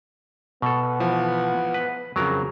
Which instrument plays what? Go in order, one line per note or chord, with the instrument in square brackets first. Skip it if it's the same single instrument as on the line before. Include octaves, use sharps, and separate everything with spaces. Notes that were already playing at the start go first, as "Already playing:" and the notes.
[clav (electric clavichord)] B2 A4 [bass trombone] B3
[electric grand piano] E3 F3
[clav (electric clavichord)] B4
[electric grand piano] F2 C#3 [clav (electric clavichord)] F#3 A#4